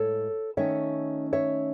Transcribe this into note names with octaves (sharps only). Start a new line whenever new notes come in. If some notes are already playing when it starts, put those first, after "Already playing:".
Already playing: A2 G#3 A4 C#5
D#3 A3 C#4 C#5 E5
C#5 E5